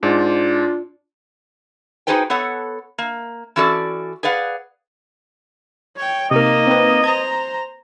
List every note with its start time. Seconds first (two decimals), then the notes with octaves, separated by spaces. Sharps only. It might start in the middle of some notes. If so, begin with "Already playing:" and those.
0.03 G#2 D4 F4
2.07 D#4 F#4 G#4 B4 C5 G5
2.30 B3 A4 C#5 F#5
2.98 A#3
3.56 E3 C#4 F#4 A4 D5
4.23 G#4 B4 D5 F5 F#5
5.96 C#5 G5
6.31 C3 A#3 D#4 A#4 D#5
6.67 C4 B4
7.04 C5 A#5 G#6